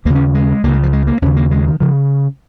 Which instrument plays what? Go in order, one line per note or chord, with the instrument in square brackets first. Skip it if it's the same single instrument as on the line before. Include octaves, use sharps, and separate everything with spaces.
[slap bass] D#2 A#3
C#3
C#4
G#3
C#2 A#3
C#3 G#3
F3
G#3
A#3
D#2 C#3 C#4
A#3
G#3
D#3
C#3 F3